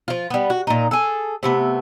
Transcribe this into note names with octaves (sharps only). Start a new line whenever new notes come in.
F3 F4
G3 B3
F#4
A#2 D#4
G#4 A4
C3 A3 B3